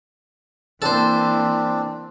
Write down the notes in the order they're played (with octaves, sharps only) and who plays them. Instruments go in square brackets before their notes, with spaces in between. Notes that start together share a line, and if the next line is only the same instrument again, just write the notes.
[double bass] E3 A#3 [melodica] C4 D4 [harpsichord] A4 C5